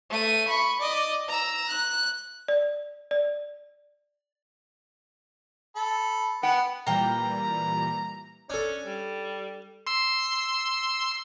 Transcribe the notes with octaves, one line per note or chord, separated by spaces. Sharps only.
A3 D#7
B5 C#6
D5 D#5
A#5 E6
F#6
D5
D5
A4 B5
B3 F#5 G5
A#2 E3 G3 A#3 G5 A#5
C#4 D4 A4
G3
C6 E6 C7